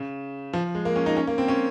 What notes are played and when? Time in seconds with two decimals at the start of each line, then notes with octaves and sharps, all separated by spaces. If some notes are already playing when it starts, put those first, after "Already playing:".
Already playing: C#3
0.53 F3
0.75 G#3
0.85 A#3
0.96 C#4
1.06 D#4
1.17 C#4
1.27 A#3
1.38 C4
1.48 C#4